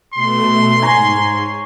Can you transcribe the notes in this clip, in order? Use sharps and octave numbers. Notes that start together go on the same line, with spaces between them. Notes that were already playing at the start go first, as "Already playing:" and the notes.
B2 A3 C6
G#2 C#5 G#5 A#5